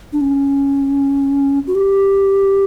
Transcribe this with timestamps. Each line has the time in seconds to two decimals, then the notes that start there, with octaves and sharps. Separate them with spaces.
0.13 D4
0.21 C#4
1.67 F#4
1.75 G4